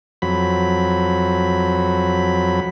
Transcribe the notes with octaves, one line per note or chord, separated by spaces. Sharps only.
F2 F#3 B5